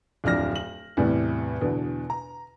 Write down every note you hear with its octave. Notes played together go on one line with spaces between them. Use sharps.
D1 F2 D4 F6 A#6
F#7
E2 A2 C3 G3
E2 B2 D3
A#5